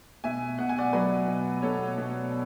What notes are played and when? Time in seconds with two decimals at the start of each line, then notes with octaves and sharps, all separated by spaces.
0.24 B2 E5 G#5
0.58 B2 F#5
0.69 G#5
0.79 D5 F#5
0.93 F#3 B4 D5
1.28 B2
1.62 B2 A4 C#5
1.98 B2